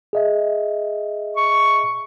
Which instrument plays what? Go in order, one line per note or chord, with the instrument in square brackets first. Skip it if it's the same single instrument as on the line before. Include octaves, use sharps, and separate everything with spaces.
[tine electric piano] G#4 D#5 E5
[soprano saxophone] C#6